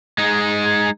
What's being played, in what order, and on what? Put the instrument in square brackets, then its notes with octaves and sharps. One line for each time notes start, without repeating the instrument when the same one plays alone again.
[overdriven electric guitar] G#3 D#4